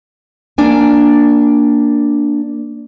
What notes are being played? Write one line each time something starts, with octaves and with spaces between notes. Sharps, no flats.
A#3 D4 G#5